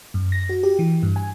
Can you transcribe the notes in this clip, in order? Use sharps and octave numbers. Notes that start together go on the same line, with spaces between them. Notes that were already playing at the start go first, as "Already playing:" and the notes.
F#2
A#6
F#4
G4
E3
G2
G#5